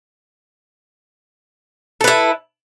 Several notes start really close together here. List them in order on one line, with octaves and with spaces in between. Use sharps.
A4 B4 E4